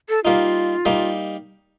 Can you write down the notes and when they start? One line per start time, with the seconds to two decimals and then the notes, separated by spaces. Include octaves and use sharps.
0.09 A4
0.24 G3 A#3 D#4 F4
0.86 G3 A#3 D#4